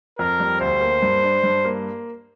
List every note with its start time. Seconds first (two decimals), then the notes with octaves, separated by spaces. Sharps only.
0.19 F2 A#4
0.40 G3
0.60 D2 C5
0.81 A#3
1.02 G2
1.23 D4
1.43 G2
1.65 A#3